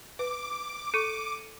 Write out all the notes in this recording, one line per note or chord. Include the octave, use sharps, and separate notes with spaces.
B4 D6
A4 C#6 C#7 D#7